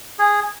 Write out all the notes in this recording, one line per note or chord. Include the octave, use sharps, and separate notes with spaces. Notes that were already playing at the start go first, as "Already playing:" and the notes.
G#4